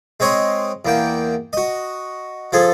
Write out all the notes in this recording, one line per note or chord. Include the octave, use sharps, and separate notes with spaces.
G#3 C4 C#5 D#5
E2 A#3 G5
F#4 D#5
F3 G#4 A4